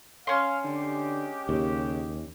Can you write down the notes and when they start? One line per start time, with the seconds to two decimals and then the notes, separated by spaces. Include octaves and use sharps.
0.27 C#4 F5 C6
0.65 D3 G#3 G4
1.49 D#2 C#3